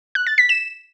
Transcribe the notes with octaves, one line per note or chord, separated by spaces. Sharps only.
F#6
A6
B6
E7